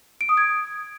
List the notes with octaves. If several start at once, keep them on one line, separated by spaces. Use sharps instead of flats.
D7
D#6
G#6